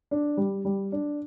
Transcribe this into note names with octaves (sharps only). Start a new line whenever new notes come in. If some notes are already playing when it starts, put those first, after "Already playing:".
D4
G3
G3
D4